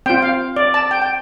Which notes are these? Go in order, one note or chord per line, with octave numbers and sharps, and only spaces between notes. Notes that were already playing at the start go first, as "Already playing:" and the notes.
C4 F4 G5
F5
D5
A5
G5
G5